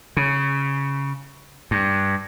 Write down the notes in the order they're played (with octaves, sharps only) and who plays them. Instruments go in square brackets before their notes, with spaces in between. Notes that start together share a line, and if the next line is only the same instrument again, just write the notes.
[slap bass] C#3
G2